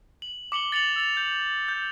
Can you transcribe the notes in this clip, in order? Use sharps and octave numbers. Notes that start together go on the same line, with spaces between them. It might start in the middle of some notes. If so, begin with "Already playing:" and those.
F#7
D6 C#7 F#7 G7
A6 C#7 F7 F#7
E6 A6 F7
G6
G6